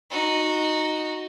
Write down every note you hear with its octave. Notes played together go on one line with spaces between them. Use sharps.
D#4 F#4